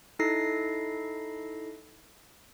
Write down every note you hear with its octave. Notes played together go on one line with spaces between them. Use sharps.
D#4 E4 A4 A#6 C7